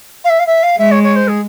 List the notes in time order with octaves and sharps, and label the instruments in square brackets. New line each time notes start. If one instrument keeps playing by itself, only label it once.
[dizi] F5
E5
F5
E5
F5
[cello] G#3 [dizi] E5
[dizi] C#5
C#5
C5
G#4